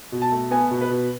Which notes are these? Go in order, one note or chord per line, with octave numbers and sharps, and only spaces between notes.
B2
A5
A3
B3 G#5
B2
B4
B2